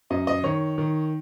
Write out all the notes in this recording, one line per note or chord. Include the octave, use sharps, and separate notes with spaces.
F#2 D#5
D#5
D#3 C#5
D#3